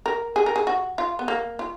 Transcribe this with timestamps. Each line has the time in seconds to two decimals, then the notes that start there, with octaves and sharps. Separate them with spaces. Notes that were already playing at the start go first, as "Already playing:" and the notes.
0.06 A#4
0.36 G#4
0.46 A#4
0.56 G#4
0.67 F#4
0.98 F4
1.19 B3
1.28 A#3
1.59 F4